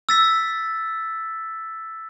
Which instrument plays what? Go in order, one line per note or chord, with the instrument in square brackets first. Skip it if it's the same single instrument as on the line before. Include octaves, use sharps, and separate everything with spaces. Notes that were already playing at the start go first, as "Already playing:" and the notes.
[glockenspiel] E6 A6 B6